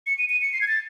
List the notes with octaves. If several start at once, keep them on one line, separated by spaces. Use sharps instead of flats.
C#7
D#7
D#7
C#7
C7
G#6
A6